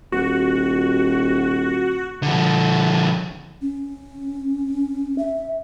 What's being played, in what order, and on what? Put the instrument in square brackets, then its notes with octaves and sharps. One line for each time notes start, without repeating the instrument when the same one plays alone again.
[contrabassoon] D#1 [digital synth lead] F#4
[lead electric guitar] D3 F3
[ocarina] C#4
E5